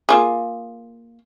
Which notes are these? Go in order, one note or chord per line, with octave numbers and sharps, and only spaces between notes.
A#3 F4 G#4